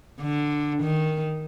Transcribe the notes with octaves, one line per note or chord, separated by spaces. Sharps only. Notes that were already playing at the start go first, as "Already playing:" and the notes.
D3
D#3